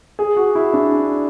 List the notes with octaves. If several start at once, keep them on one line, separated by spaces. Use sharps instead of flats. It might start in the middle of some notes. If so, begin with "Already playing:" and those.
G#4
F#4
E4
D4